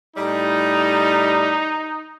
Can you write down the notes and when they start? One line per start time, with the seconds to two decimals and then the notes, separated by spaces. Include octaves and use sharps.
0.16 A2 G3 D#4